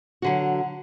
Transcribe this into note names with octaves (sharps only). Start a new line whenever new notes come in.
D3 F#3 F#4